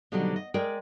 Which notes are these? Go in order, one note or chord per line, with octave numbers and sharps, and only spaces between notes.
B2 D3 D#3 F#3 G3 C4
D#5
G#3 A#4 D5 G5